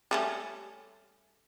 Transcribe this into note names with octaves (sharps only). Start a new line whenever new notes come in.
G3 A3 C#4